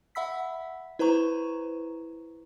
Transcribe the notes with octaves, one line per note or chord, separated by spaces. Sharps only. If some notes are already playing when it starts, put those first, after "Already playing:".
E5 F#5 B5 E6 B6
E4 B4 C5 A#5 C#6